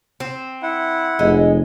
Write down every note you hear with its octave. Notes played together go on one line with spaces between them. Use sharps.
C4
E4 F#5
F1 G#3